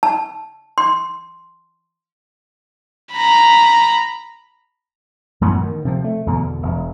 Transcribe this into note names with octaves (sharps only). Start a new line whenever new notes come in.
A5
C6
A#5 B5
F#2 A2 E3 B3
D#3
C3 F3
A3
E2 B2 D3
E1